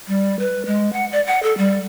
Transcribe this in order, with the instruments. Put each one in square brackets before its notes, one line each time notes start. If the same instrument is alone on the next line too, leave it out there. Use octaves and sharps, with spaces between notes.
[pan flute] G3
B4
G#3
F#5
D5
F#5
A4
G3